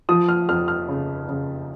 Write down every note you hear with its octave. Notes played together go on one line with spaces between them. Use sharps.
F3 D#6
F6
F2 F6
F6
C#3
C#3